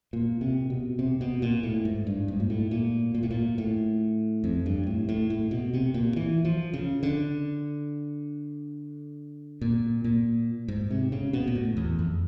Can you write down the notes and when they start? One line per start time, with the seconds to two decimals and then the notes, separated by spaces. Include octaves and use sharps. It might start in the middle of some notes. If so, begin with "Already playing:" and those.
0.13 A#2
0.41 C3
0.70 B2
0.99 C3
1.21 B2
1.42 A#2
1.63 A2
1.85 G#2
2.07 G2
2.28 G#2
2.40 A#2
2.50 A2
2.71 A#2
3.15 A#2
3.23 A2
3.31 A#2
3.58 A2
4.44 F2
4.66 G2
4.87 A2
5.09 A2
5.30 A2
5.51 B2
5.73 C3
5.94 A#2
6.16 E3
6.45 F3
6.74 C#3
7.03 D3
9.61 A#2
10.04 A#2
10.68 G#2
10.91 C3
11.12 C#3
11.33 B2
11.48 A#2
11.55 A2
11.77 E2
11.99 F2